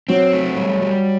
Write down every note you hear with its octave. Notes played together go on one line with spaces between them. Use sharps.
F#3 C4
A3
G3
G3